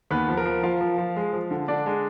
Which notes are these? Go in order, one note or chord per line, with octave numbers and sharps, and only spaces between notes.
D#2 B3 B4
F3
A#4
F3
F3 F4 F5
F3
F3
G#3
F3
D3
D3 D4 D5
G#3